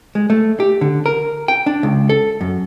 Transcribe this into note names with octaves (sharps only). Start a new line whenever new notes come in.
G#3
A3
G4
D3
A#4
G5
D4
C#2
A4
F#2